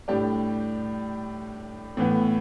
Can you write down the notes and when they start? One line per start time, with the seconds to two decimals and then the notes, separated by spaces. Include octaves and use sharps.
0.08 A2 G3 D4 G4
1.97 A2 E3 B3